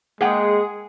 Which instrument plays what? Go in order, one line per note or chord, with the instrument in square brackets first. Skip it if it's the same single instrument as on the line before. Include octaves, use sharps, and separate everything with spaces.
[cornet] G#3 [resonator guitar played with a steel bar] A#3 F#5 G5 [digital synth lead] G#4